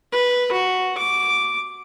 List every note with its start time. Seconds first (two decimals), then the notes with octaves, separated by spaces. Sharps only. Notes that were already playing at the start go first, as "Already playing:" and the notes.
0.12 B4
0.52 F#4
0.98 D6